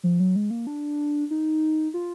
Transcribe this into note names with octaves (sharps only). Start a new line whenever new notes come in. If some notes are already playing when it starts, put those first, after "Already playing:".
F3
F#3
G#3
A#3
D4
D#4
F4